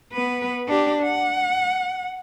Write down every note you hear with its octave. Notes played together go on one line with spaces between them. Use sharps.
B3 B4
D4 G4
F#5